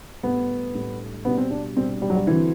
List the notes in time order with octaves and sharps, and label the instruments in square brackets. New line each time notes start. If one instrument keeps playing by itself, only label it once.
[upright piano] A2 G3 D4 G4 [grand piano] B3
[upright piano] A2 G3 D4 G4
[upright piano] B2 G3 D4 G4 [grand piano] B3
[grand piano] C4
D4
[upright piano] B2 G3 D4 G4 [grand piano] C4
[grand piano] G3
F#3
G3
[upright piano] D3 F#3 C4 [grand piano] E3